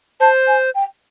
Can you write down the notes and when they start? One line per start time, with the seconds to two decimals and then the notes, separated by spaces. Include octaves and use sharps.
0.20 C5 A5
0.47 G#5
0.75 G5